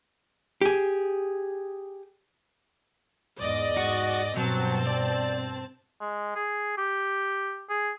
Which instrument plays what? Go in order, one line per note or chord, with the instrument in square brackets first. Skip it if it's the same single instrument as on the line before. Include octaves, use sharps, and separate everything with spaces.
[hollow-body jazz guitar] G4 G#4
[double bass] E2 G#2 [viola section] D5 D#5
[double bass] G#2 [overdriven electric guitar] F#4
[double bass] G2 B2 [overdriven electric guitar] F#3 [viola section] C4 A5
[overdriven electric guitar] D5
[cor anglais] G#3
G#4
G4
G#4